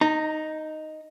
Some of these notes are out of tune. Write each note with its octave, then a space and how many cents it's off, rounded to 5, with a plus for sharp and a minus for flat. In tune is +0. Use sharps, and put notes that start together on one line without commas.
D#4 +0 A#5 -30